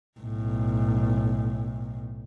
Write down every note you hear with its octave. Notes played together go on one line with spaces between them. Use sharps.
B1 A2